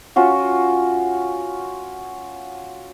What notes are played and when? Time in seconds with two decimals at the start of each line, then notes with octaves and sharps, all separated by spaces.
0.16 C#4 F4 F#4